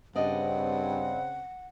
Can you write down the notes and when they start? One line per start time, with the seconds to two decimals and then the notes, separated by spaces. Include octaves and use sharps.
0.16 G2 C#3 C4 D5 D#5 F#5